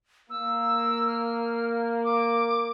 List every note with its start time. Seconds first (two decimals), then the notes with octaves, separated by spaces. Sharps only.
0.30 A#3 E6
1.07 F6
2.04 D6